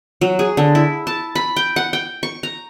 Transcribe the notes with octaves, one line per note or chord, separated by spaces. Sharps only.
F#3
G#4
D3
E4
A5
B5
G5
F#5
G5
C#6
A#5